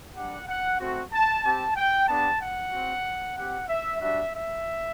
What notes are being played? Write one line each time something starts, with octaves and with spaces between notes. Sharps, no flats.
G3 D4 G4 F#5
F#5
A3 C4 F#4
A5
C4 G4 A5
G5
B3 D4 G4 A5
F#5
C4 F#4
C4 G4 F#5
E5
G3 D4 F#4 E5
E5